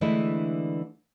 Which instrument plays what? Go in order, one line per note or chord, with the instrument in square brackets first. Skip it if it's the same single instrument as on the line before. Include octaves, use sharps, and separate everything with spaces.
[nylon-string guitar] D3 E3 G#3 A3 D4 E4